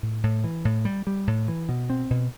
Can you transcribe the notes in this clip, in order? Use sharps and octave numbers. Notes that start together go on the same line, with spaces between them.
A2
A2
E3
A2
G3
G3
A2
E3
B2
C4
B2